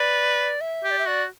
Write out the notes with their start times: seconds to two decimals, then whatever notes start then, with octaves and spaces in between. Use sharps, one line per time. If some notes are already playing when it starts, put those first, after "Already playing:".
Already playing: B4 D5
0.61 E5
0.84 G4
0.91 D5
0.99 E5
1.06 F#4 D5